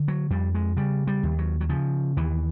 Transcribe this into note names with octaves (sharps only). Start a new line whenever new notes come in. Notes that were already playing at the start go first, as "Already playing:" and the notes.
Already playing: D3
F#3
F2 G3
G#3
C#3 G3
G3
D#2
F#3
F#3
C#3 F3
D#2 E3